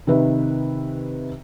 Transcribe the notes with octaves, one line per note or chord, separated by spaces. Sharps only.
C3 D#3 B4 E5